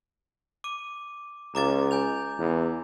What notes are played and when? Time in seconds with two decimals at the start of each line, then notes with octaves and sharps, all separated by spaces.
0.64 D6 D#7
1.55 C#2 A#5 D6 A6
1.91 G#5 G6 F7
2.39 E2